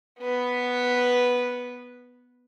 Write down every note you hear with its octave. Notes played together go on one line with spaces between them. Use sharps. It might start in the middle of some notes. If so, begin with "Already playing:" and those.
B3 B4